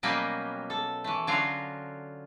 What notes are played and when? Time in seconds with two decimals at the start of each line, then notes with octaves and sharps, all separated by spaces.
0.03 B2 F#3 G3 A#3 B3 C#4
0.70 A4
1.04 E3 A3
1.27 D3 F#3 C#4 F4 F5 A#5